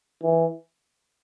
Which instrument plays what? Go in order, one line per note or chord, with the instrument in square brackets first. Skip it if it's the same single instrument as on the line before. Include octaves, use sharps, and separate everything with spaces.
[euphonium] E3